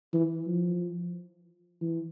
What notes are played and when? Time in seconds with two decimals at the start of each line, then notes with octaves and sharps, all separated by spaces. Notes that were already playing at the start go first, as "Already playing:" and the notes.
0.14 E3
0.47 F3
1.81 E3